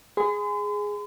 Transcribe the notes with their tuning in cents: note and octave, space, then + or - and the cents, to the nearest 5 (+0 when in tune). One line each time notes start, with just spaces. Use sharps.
G#4 +0 C6 -45